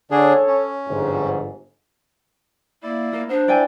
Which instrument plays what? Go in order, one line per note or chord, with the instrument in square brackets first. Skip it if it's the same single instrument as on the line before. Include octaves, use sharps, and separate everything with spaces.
[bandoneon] D3 D4 G#4 [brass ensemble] A4 C#5
[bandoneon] C#4
[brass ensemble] G1 F2 G#2
[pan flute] A#3 [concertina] E4 D5
[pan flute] A#3 [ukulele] A#4
[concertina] B3 [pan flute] D4 [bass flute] C5
[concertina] E4 [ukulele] D5 G5 G#5